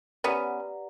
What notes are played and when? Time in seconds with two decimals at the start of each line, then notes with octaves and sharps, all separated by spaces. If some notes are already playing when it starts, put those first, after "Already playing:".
0.24 B3 C#4 G4 B4 D5 F#5 A#5